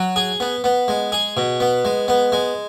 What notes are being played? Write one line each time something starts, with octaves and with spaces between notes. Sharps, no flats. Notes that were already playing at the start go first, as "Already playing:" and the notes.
Already playing: F#3
G#4
B3
B3
G#3
G#4
B2
B3
G#3
B3
G#3